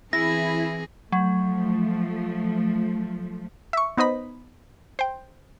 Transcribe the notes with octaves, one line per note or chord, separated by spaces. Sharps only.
E3 C4 E4 G#4 A#6
F3 F#3 A3
E5 C#6
B3 D#4 C5 D#5 B5
C5 G5